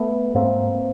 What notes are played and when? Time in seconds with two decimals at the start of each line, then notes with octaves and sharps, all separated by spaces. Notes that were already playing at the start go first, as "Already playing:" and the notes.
Already playing: A3 B3
0.35 G#2 A#3 C4